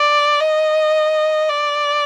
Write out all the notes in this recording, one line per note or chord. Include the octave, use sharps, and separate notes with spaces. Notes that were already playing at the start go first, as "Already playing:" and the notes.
Already playing: D5
D#5
D5